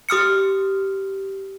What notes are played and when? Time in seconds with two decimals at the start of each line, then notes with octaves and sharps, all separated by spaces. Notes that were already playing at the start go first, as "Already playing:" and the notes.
0.09 G4 D#6 F6 C#7